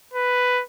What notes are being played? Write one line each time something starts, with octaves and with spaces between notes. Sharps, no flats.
B4